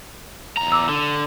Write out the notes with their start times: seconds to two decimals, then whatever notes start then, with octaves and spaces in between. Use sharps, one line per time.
0.57 E2 A#5
0.72 D6 E6
0.89 D3